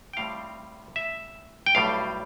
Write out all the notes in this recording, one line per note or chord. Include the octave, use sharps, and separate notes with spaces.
G5
A2 G3 C4 F5
E5
G5
B1 A2 G3 F5